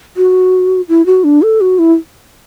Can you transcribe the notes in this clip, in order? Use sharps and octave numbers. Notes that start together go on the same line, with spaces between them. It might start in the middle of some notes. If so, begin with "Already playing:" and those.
F#4
E4
F#4
D4
A4
F#4
E4